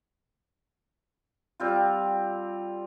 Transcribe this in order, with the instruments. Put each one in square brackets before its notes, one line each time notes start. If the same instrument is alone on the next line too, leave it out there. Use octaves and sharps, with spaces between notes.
[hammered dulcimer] G3 C4 F4